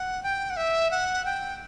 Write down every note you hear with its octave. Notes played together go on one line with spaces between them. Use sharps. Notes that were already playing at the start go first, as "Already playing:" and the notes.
Already playing: F#5
G5
F#5
E5
F#5
G5